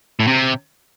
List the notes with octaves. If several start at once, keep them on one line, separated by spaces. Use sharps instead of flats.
A2
C3